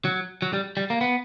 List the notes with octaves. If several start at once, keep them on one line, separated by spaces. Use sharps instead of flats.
F#3
F#3
G3
G3
A#3
B3